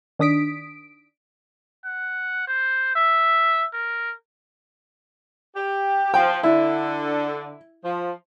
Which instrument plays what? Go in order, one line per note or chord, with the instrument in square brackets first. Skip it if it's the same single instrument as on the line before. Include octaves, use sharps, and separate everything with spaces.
[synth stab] D#3 D4 D#6 B6 D7
[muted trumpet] F#5
C5
E5
A#4
[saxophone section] G4
[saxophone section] F3 [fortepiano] G5
[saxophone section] D3 [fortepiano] E4
[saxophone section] F3